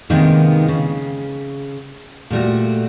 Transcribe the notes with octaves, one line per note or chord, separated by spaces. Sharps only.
C3 D#3 G#3 A#3 B3 D#4
C#3
A#2 G3 A3 F#4